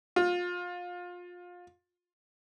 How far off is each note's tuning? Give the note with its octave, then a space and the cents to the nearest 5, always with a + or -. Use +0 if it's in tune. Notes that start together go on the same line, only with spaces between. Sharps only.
F4 +25